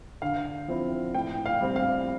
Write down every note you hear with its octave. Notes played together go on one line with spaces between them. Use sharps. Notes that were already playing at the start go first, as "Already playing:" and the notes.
D3 F5
F3 C4 E4
A2 G5
F5
G3 C4
F5